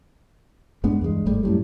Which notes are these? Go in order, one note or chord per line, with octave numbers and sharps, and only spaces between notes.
G2 G#3 B3 D4
E2 G2 G3 G#3
G1 G#2 G3 A3
F#2 A2 G3